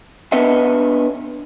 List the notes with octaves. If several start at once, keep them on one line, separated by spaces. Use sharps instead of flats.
B3 D4 B4 C#5 D#5 E5